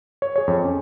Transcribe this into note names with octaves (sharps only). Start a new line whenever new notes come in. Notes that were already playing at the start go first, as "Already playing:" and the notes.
C#5
G#4 C#5
F2
C#4